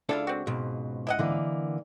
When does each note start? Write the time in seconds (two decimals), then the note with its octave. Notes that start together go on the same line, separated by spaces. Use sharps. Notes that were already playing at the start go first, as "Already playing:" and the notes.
0.09 C#2 D4 E4 F4 A4 F5
0.27 C4 F#4
0.47 C#2 G#2 B2
1.07 E4 D#5 F#5
1.19 D3 E3 A#3